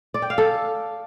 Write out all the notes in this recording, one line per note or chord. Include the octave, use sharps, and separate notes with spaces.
D5
G5
F5
A4